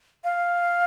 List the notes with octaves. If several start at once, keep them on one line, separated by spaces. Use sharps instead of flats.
F5